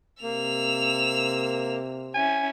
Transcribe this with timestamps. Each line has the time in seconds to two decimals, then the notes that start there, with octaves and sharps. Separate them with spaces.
0.23 C3 A#3 E6 F7
2.15 C#4 E4 G#5